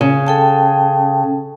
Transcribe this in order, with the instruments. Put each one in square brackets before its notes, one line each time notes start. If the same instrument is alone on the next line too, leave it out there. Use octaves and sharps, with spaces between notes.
[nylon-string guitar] C#3
[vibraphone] A4 G5 A5